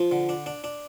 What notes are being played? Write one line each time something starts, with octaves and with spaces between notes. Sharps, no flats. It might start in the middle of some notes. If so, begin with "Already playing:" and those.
Already playing: F3
D3
D4
D4
D4